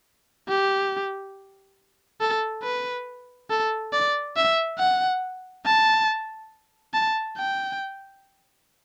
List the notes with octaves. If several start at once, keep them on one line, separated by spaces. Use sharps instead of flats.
G4
A4
B4
A4
D5
E5
F#5
A5
A5
G5